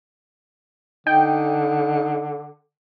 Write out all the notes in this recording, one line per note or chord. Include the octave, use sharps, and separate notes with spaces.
D3 D#4 G5